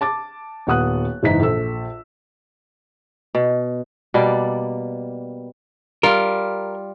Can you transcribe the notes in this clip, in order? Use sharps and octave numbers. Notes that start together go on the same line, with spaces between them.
A5 D6 A6
D#1 B3 F#5 D#6 F#6
F#1 G#2 E3 D#4 A#5 B6
A#1 A4 E6
B2
B2 G3 A#3 D5
G3 F4 A#4